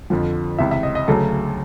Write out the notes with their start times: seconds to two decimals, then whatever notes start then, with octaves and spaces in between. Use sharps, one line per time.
0.10 F2 D3 F3
0.59 C#2 C3 E3 E5
0.71 E5
0.83 D#5
0.95 D#5
1.08 D2 C#3 F#3 A4